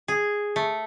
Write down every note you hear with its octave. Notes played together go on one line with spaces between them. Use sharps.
G#4
A3